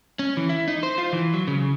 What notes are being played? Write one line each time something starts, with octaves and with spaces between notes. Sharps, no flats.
C#4
E3
E4
D#4
C5
F4
E3
F#3
C#3